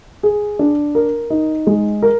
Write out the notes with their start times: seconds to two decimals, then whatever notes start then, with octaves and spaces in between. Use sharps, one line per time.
0.23 G#4
0.59 D4
0.95 A#4
1.30 D#4
1.67 G#3
2.02 A#4